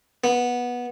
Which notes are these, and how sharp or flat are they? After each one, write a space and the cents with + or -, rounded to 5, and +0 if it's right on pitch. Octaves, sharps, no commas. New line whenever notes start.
B3 -15